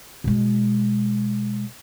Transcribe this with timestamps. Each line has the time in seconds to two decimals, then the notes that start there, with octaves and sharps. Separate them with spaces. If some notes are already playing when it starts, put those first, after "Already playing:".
0.24 B2 G#3